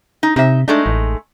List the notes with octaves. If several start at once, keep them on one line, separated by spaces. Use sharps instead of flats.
D#4
C3 D#4 E5
G#3 A3 D4 D#4
A1